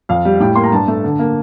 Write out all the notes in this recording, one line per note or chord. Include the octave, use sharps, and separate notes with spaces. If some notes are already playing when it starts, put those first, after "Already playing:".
F2 F5
G3
A2 G5
A#3 C6
A#5
G2 A5
A3
D3
A#3